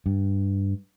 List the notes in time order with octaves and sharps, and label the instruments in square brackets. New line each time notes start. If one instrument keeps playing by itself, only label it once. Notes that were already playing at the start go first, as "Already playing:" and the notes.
[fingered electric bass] G2